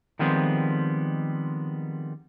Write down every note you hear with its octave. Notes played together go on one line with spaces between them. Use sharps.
D#3 F3 G3 G#3 B3 C4